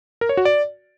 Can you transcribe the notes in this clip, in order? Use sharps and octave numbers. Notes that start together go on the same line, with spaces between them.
A#4
C#5
F#4
D5